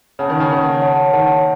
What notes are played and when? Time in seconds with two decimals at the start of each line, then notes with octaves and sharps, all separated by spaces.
0.19 C#3 C#5 F#5 A5
0.30 D#3
0.40 C#3
0.50 D#3 C#5 F#5 A5
0.82 C#5 F#5 A5
1.13 D#3 C#5 F#5 A5